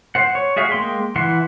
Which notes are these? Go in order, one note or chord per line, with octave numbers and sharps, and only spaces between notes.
C5 F#5
C#5
F#4 G#4 E5 F5
G#3 A#3 G5 C6
E3 E4 F#5 C6